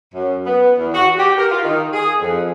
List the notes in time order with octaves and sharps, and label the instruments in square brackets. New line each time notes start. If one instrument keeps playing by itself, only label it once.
[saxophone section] F#2
B3
E2
F#4
G4
A#4
F4
D#3
G#4
F2